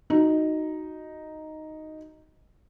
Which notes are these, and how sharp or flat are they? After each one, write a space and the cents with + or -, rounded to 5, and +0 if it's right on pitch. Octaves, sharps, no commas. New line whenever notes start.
D#4 +0 F#4 +0